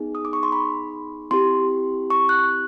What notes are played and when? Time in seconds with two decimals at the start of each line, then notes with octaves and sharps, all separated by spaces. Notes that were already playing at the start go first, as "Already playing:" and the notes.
Already playing: B3 D#4 G#4
0.15 D#6
0.25 D6
0.33 C#6
0.43 C6
0.52 B5
1.31 C4 E4 G4 C6
2.10 C#6
2.29 F#6